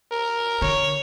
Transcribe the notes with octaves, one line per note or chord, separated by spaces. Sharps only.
A#4
D3 C#5